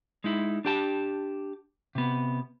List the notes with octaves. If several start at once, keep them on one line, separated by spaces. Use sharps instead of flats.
G#3 D#4 E4
D4 G4 A5
C3 B3